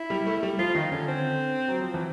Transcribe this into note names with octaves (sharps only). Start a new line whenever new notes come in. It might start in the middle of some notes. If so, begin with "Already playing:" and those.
Already playing: E4
G3
A3
G3
F3 F4
D#3 D#4
D3 C#4
C4
F#3
F3
E3